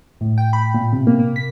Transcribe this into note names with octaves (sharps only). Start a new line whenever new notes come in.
A2
G5
B5
A#2
C3
A#3
A#3
B6